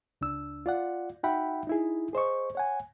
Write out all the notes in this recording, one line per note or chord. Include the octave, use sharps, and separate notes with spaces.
C#2 D4 E6
F4 D5 F#5
D#4 F#4 E5 F#5 G5 B5
D#4 E4 G#4
G#4 C5 D#5 C#6
C#5 F#5 G#5